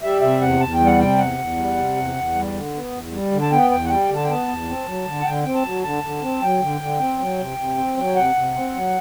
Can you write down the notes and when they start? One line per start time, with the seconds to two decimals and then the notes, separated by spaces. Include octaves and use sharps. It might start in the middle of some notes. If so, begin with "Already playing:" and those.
0.02 G3 E5
0.21 C3 E5
0.41 E2 F#5
0.60 E2 A5
0.74 G5
0.80 G3
0.86 F#5
0.99 C3 G5
1.19 E2 F#5
1.38 E2
1.57 G3
1.77 C3
1.96 E2
2.16 E2
2.35 G3
2.54 D3
2.74 B3
2.92 E2
3.12 G3
3.32 D3
3.42 A5
3.51 B3 G5
3.70 E2 G5
3.85 F#5
3.89 G3 G5
4.09 D3
4.16 A5
4.24 G5
4.28 B3 A5
4.48 E2
4.68 C4
4.87 F#3
5.05 D3
5.21 F#5
5.26 D3 G5
5.43 C4 G5
5.55 A5
5.64 F#3
5.83 D3 A5
6.03 D3
6.22 C4
6.42 F#3 G5
6.61 D3
6.81 D3
7.00 C4
7.19 F#3
7.38 C3
7.58 C3
7.77 C4
7.97 F#3
8.16 C3 F#5
8.35 C3
8.55 C4
8.74 F#3